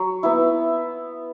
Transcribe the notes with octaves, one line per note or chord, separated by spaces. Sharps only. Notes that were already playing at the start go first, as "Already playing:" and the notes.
Already playing: F#3
B3 E4